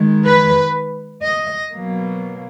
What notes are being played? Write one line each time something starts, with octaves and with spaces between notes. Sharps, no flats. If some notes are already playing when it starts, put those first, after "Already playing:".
Already playing: D#3 G#3
B4
D#5
B2 F#3 A#3